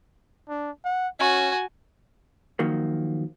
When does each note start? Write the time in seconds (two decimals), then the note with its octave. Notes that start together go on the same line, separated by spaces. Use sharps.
0.49 D4
0.85 F#5
1.20 C#4 F#4 G#5
2.59 D#3 F3 F#3 A#3